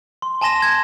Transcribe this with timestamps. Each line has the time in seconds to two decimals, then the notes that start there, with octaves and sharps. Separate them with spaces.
0.22 C6
0.41 G#5 A5 C6 A#6 E7
0.62 G#6